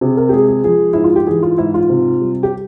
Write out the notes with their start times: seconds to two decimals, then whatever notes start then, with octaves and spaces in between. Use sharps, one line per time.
0.01 C3 G#4
0.17 A#4
0.29 G4
0.33 G#3 G#4
0.48 G#4
0.64 F3 G#4
0.93 G#2 E4
1.04 F4
1.16 G4
1.27 E3 G#4
1.42 F4
1.58 G#2 E4
1.74 F4
1.89 C3
2.21 G3
2.43 G4